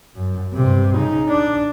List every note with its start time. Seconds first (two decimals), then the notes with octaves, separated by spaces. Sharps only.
0.15 F#2
0.53 G2 C3
0.95 C#3 D#4
1.29 D4